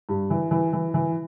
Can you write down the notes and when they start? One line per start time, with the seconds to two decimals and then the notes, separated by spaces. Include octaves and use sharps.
0.09 G2
0.30 E3
0.51 E3
0.73 E3
0.94 E3